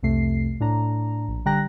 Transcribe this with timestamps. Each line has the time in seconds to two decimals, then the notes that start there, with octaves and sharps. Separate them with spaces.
0.03 C2 F2 C3 A3 C7
0.60 A2 D4 A#5
1.28 A#1
1.46 D3 G3 G5 A#5 F#6 A#6